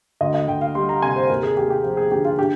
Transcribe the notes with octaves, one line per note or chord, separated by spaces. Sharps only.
D2 D#5
D#5
D2 G5
F5
G3 C6
A#5
C3 G#5
C5
D#2 A#4
G#4
D#2 G4
G4
F3
G#4
D3 G4
F4
D4 G4